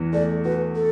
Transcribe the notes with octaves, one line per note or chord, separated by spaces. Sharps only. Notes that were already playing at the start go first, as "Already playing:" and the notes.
Already playing: E2 E3
A3 D5
F#4 B4
A4